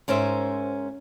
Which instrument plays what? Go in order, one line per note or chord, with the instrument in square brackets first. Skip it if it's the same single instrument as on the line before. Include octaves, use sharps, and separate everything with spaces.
[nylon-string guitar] G#2 C#4 A#4 C5 E5